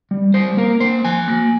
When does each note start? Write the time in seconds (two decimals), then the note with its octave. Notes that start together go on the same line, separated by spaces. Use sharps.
0.11 G3
0.34 G3 C5
0.57 A#3 A#4
0.80 A#3 C5
1.04 F3 G#5
1.28 A#3